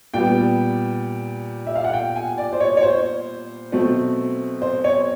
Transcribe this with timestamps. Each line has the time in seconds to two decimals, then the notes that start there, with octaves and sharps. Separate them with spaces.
0.14 A#2 G3 B3 G5
1.67 E5
1.75 F5
1.84 F#5
1.93 G5
2.16 G#5
2.38 D5
2.53 C5
2.60 C#5
2.77 C#5
2.83 C5
3.72 B2 F#3 A3 C4
4.62 C5
4.84 C#5